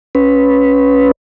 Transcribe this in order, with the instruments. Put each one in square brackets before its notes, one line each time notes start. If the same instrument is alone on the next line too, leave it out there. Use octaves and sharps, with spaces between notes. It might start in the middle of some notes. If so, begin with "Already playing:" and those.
[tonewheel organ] C#4 B4